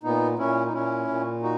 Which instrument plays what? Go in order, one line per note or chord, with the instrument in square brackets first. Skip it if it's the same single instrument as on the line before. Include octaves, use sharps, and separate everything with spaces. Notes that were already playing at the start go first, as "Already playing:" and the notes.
[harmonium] A#2 B3 D#4
A#2 C#4 E4
D#4
A#2 C#4 E4
A#2
D#4 F#4